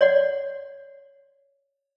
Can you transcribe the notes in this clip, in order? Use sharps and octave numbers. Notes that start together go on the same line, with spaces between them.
C#5 D5 F#5